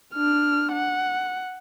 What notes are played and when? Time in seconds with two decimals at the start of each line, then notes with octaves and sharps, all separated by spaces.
0.14 D4 F6
0.72 F#5